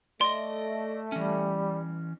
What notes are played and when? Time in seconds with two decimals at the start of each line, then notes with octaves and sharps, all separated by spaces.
0.21 A3 D5 D#5 C6
1.12 E3 G3 C#4